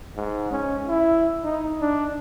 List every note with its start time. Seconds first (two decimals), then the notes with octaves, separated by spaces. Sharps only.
0.16 G#2
0.52 C#4
0.88 E4
1.44 D#4
1.81 D4